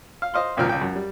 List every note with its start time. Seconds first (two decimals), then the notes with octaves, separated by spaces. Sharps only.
0.22 F5
0.34 C5 D#5 F5 C6
0.57 G#1 C#2 A#2 F3 G5 F6
0.69 C#2 G5
0.82 F#2
0.96 G3